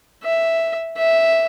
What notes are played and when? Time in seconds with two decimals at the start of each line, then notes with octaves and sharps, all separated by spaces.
0.23 E5
0.97 E5